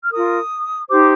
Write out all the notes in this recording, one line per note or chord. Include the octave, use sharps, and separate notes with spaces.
F6
F4 A#4 D#6
D#4 G4 C5 D6